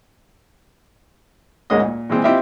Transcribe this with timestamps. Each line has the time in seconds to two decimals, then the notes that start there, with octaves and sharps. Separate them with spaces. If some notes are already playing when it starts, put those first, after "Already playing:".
1.70 D2 G#2 G#3 A#3 C#4 D#5
1.82 A#2
2.09 A#2 E3 G#3 C4
2.24 C4 E4 F4 G4 D#5 E5